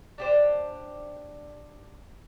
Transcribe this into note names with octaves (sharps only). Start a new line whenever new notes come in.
D4 G4 C5